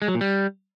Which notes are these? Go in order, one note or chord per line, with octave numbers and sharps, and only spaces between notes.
G#3
F#3
A#2
G3